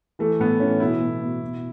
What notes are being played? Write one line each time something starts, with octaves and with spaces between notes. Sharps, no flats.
E3 A3
A2 B3
E3 C#4
B2 E4
B2
B2
B2